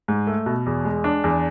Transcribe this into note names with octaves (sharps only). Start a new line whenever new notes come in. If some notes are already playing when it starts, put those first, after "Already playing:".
G#2
A3
B2
E2
G#3
D4
E2